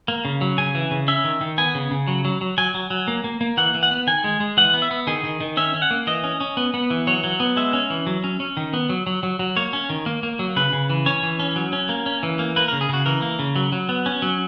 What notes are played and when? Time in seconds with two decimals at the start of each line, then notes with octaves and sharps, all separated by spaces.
0.08 A#3
0.25 C#3
0.41 F#3
0.58 C#3 G#5
0.75 E3
0.91 C#3
1.08 C#4 E5
1.24 D#3
1.41 D#3
1.58 B3 G#5
1.75 C#3
1.91 C#3
2.08 F#3
2.25 F#3
2.41 F#3
2.58 F#3 G#5
2.74 F#3
2.90 F#3
3.08 A#3
3.24 A#3
3.41 A#3
3.57 E3 F#5
3.74 E3
3.83 F#5
3.91 B3
4.07 D#3 G#5
4.24 G#3
4.40 G#3
4.57 E3 F#5
4.74 B3
4.82 E5
4.91 B3
5.07 D#3 G#4
5.24 D#3
5.41 D#3
5.57 C#4 E5
5.74 C#4
5.82 F#5
5.91 A#3
6.07 E3 D#5
6.24 C#4
6.41 C#4
6.57 B3
6.74 B3
6.90 E3
7.07 F#3 C#5
7.24 F#3
7.40 B3
7.57 G#3 E5
7.73 C#4
7.90 E3
8.07 F#3
8.24 C#4
8.40 C#4
8.57 D#3
8.74 B3
8.89 F#3
9.07 F#3
9.23 F#3
9.39 F#3
9.57 A#3 C#5
9.73 C#4
9.90 D#3
10.06 A#3
10.23 A#3
10.39 F#3
10.56 C#3 B4
10.73 C#3
10.90 E3
11.06 C#4 C#5
11.23 E3
11.40 C#4
11.56 F#3
11.73 C#4
11.89 A#3
12.06 C#4
12.23 E3
12.39 A#3
12.56 A#3 B4
12.68 A#4
12.73 C#3
12.81 G#4
12.89 C#3 F#4
13.06 E3 A#4
13.22 A#3
13.39 C#3
13.56 F#3
13.72 F#3
13.89 B3
14.06 C#4
14.22 F#3